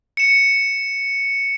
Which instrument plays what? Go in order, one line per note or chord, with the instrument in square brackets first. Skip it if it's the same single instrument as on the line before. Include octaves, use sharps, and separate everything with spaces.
[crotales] C#7 E7